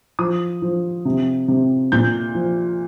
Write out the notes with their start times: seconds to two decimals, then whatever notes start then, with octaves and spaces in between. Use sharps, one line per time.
0.19 F3 D#6
0.62 F3
1.05 C3
1.48 C3
1.92 A#2 G6
2.35 F3